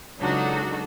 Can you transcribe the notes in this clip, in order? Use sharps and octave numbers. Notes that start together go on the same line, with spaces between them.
C#2 F#3 D4 D#4 F#4 A4